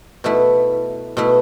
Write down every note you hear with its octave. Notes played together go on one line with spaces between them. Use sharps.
B2 A3 E4
B2 A3 E4